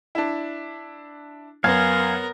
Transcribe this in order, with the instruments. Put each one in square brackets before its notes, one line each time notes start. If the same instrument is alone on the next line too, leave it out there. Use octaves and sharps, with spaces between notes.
[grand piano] D4 E4
[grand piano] F#2 [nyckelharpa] B3 A#4 [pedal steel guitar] F5 G#5